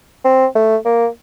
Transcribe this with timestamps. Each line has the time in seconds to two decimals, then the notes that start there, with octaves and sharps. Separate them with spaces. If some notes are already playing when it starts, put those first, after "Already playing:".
0.24 C4
0.55 A3
0.85 A#3